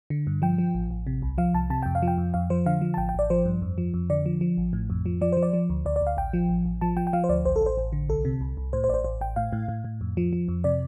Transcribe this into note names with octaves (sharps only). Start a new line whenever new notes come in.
D3
G2
F3 G5
F3
A1
A1
C3
C2
F3 F5
C2 A5
C3 A5
F2 G5
F5
F3
G5
F2
F2 F5
F3 C5
D3 F5
F3
A5
A1 G5
G5
A1 D5
F3 C5
G2
F2
F3
F2
D3 D5
F3
F3
A1
A2
F2
F3
F3 D5
F3 C5
D5
F3
D2
D2 D5
D5
D2
F5
A1 G5
F3
A1
A1
F3 A5
F3 G5
G5
F3 F5
C5
D2 D5
A1 C5
A4
A1
C5
A1
D3
C2 A4
C3
C2
C2
A2 C5
C5
A1 D5
C5
A1 C5
A1 G5
A2 F5
A2
A2
A2
F2
F3
F3
F2
C3 D5